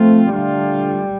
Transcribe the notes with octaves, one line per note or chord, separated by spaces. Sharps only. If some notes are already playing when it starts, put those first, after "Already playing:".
Already playing: F3 A3 C4 F4
D3 G3 A3 D4 F4